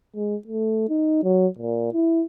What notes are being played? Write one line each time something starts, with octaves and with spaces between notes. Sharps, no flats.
G#3
A3
D#4
F#3
A#2
E4